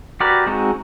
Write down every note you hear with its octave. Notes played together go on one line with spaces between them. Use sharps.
F#4 G4 A#4 B4 D5
G#3 C4 D#4 F#4